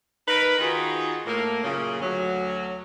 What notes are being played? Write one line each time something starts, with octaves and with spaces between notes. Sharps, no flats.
D#4 A#4 B4
D#3 D#4 F4 F#4 G#4
A2 A#3
F#2 A#2 C#3
D2 F#3